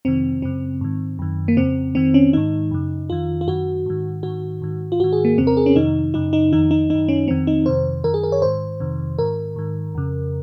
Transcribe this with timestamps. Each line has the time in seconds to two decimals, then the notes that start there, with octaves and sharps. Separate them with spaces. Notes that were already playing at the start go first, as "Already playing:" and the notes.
0.05 F2 C3 D#3 C4
0.42 F#2 C#3 C4
0.81 G#2 D#3
1.19 F#2 D#3
1.48 A#3
1.57 F2 C#3 C4
1.95 F2 D#3 C4
2.14 C#4
2.33 G#2 D#3 D#4
2.71 F#2 C#3
3.10 F2 D#3 F4
3.41 F4
3.47 F#2 D#3 F#4
3.86 G#2 D#3
4.23 G#2 D#3 F#4
4.62 G#2 D#3
4.92 F4
4.99 G#2 D#3 F#4
5.13 G#4
5.25 A#3
5.38 F2 C#3 C4
5.47 A#4
5.57 G#4
5.66 C#4
5.75 F2 C3 D#3 D#4
6.14 F#2 C#3 D#4
6.33 D#4
6.53 F2 D#3 D#4
6.71 D#4
6.90 F#2 D#3 D#4
7.08 C#4
7.28 F2 D#3 C4
7.47 D#4
7.66 F2 C3 D#3 C5
8.04 F#2 D#3 A#4
8.14 G#4
8.23 A#4
8.32 C#5
8.42 G#2 D#3 C5
8.80 F2 C3 D#3
9.19 G#2 D#3 A#4
9.56 G#2 D#3
9.95 F2 C#3